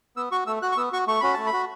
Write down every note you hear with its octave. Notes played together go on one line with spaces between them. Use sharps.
B3 E6
F#4 C#6
A3 E6
F#4 F#6
C#6
B3 E6
F#4 C#6
A3 C#6
C#4 F#4 B5
A3 A5
B5
F#4